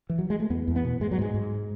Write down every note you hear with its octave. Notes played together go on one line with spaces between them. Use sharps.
E3
F#3
G#3
A3
E2 B3
E2
B3
B2
G#2 G#3
F#3
G#2 G#3
G#2